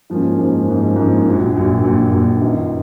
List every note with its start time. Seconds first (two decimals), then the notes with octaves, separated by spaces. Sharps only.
0.10 G#2 F3 A#3 C#4
0.38 G#2 F3 A#3 C#4
0.68 G#2 F3 A#3 C#4
0.96 G#2 F3 A#3 C#4
1.26 A#1 A#2 F#3
1.55 A#1 A#2 F#3
1.84 A#1 A#2 F#3
2.12 A#1 A#2 F#3
2.40 G1 F#2 D#3